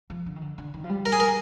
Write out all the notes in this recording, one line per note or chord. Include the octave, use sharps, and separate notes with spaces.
F3
D3
D#3
D3
D3
D#3
F3
G3
A#4
G#4
A#4